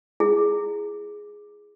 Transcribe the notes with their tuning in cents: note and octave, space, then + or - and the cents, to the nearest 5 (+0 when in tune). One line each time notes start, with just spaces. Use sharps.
E4 +20 G#4 +0